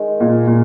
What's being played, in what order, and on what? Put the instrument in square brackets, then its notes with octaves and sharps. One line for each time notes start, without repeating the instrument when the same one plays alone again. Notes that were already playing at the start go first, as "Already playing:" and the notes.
Already playing: [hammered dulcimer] D#3 G#3
[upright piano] A#2
A#2